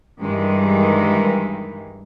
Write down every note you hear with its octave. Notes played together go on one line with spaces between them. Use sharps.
G2 D#3 E3 G#3